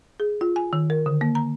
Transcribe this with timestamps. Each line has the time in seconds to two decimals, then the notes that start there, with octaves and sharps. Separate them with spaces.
0.20 G#4
0.41 F4
0.56 G#5
0.73 D#3
0.90 A#4
1.06 D3
1.21 A#3
1.35 A#5